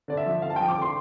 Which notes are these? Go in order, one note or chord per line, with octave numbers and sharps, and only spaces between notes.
D3 D5
E5
F3
D3 F5
A5
F3 G5
D6
D3 C6